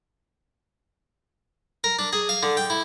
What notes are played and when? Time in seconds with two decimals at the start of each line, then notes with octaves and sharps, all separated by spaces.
1.84 A#4
1.99 D4
2.13 G#4
2.29 F5
2.43 D3
2.57 G5
2.70 E4